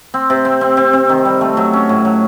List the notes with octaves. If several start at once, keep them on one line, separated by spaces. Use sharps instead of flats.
C4
C3
C4
C4
C4
C4
D#3
G3
A3
F#3
C#4
A2
F#3